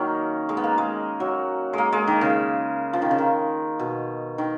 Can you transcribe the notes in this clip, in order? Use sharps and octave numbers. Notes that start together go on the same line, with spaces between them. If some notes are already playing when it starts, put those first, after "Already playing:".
Already playing: D#3 F#3 A#3 C#4 D#4
G#3
B3
A#3
G#3
F#3
G#3 A#3
G#3
D#3
C#3
F3
D#3
C#3
D#3
B2
D#3